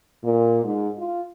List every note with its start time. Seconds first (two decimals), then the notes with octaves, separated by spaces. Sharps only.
0.23 A#2
0.64 G#2
0.99 F4